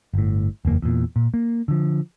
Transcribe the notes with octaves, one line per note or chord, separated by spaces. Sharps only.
G1 A2
F#1 E2 A#3
E2 A#2
A#2
A#3
D3 F3